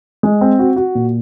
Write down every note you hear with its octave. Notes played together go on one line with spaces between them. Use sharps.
G#3
C4
F#4
F#4
A#2